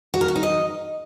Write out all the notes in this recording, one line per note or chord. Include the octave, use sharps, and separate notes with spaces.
F#4
A#4
F#4
D#4
D#5